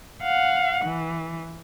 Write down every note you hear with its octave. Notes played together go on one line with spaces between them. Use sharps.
F5 F#5
E3